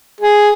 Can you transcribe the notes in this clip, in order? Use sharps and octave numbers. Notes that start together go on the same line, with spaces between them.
G#4